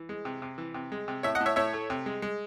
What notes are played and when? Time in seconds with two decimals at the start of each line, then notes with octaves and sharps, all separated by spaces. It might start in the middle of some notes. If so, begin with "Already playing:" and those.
Already playing: E3
0.09 G#3
0.25 C3
0.42 C3
0.58 E3
0.74 C3
0.92 G#3
1.08 C3
1.23 A2 C#5 E5
1.35 D#5 F#5
1.40 A2
1.46 C#5 E5
1.56 A2 C#5 E5
1.73 A3
1.90 C3
2.06 G#3
2.22 G#3